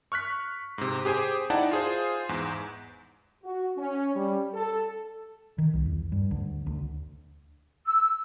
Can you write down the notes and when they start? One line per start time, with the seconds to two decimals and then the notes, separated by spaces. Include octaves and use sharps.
0.12 C#6 F6 F#6 B6
0.78 G#2 C3
1.05 G4 G#4 C5 G#5
1.50 D#4 E4 D5 F#5 G5 A5
1.71 F4 G#4 C5
2.29 E2 G#2
3.43 F#4
3.77 C#4
4.15 G3
4.54 A4
5.58 D#3
5.74 C2
5.86 E2
6.12 G2
6.31 D2
6.66 D2
7.86 E6